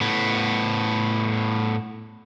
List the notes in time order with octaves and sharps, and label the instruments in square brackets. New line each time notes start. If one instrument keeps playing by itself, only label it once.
[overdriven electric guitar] A2 B3